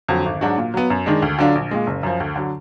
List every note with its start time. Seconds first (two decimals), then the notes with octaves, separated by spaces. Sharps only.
0.08 F2 D3 F#3
0.26 G#1
0.41 G#2 F#3 D4 F#4
0.58 A#2
0.74 F#3 B3
0.90 F#2
1.06 D#3 G#3 D4
1.22 D2
1.38 D3 F#3 D4 F4
1.55 A#1
1.71 A#2 G#3
1.87 F#1
2.03 F#2 F3
2.20 D2
2.36 D3 F#3